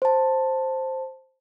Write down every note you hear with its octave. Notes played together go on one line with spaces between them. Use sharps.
C5 A5